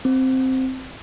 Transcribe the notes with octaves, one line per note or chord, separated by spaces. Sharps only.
C4